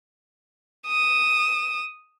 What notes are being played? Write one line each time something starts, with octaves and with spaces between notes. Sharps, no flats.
D#6 E7